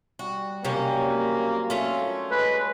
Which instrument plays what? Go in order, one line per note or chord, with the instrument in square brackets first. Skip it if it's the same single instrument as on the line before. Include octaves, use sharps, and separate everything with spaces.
[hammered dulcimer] G3 [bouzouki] F#4
[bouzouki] C3 C#4 [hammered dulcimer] F#3 G3 F#4 [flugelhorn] A#3
[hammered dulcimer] A#2 F#3 C4
[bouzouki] A3 C#4 [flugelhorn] F4 [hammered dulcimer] G#4 A4
[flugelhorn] G#3 [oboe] B4